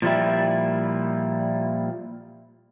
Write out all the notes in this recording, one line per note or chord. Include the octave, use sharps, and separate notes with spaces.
A#2 F3 G3 E4